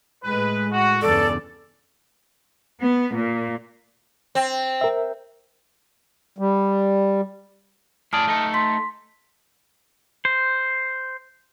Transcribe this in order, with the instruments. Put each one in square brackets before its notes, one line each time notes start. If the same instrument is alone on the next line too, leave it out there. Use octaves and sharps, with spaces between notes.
[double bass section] A2 G#3 [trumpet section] B4
[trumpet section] F#4
[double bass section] E2 G2 C#3 [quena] A4 [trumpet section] D5
[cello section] B3
A#2
[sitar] C4
[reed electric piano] A#4 E5
[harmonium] G3
[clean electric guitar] A2 G#4 D5 [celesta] A5 D#6 F6
[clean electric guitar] A3 D#4 A4
[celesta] C6 B6
[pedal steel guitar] C5